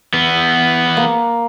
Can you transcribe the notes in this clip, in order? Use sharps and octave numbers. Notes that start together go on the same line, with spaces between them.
E3 B3
A#3